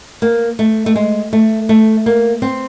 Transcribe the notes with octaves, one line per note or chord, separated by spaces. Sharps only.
A#3
A3
A3
G#3
A3
A3
A#3
C4